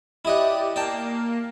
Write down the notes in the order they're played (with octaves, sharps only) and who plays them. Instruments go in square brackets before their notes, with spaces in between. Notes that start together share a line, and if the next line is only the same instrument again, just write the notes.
[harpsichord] E4 D#5 F#5 [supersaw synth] G4 D5
[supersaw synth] A#3 [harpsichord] D5 G5 A5